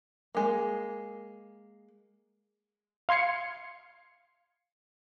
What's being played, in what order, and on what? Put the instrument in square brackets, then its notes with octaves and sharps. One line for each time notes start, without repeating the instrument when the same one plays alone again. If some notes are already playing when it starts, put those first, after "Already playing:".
[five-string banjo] G#3 A#3
[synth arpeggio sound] F5 C6 G#6 C7 C#7